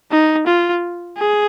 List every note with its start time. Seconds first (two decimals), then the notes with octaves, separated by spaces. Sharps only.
0.11 D#4
0.47 F4
1.18 G#4